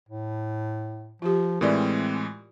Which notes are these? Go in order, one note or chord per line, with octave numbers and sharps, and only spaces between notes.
A2
F3 F4 G4
A2 E3 G#3 C4 A#4 D5